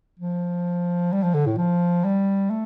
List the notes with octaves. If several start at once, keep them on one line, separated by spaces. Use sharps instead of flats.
F3
G3
F3
D3
A2
F3
G3
A3